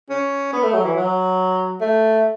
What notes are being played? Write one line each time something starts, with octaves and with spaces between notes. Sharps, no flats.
C#4
B3
A3
F#3
E3
F#3
A3